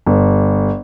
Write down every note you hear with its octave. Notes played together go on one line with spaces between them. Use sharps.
G1